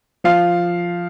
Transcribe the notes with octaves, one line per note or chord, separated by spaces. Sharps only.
F3 F5